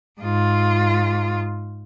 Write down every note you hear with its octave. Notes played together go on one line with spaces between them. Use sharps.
G#2 F4